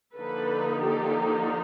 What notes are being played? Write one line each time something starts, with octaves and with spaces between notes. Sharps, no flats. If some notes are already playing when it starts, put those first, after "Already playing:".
D3 F3 A#3 D#4 A4 B4
G4 A4